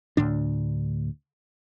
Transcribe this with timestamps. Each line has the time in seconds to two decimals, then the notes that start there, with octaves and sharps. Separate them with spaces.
0.17 D2 A2 D3 D4